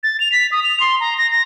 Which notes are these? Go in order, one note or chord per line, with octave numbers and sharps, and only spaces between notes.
A6
F7
B6
D#6
F7
C6
A#5
A#6
A#6